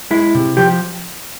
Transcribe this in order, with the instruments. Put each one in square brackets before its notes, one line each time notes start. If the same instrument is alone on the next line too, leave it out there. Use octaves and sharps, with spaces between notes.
[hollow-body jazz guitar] G#3 E4
C3
F3 G4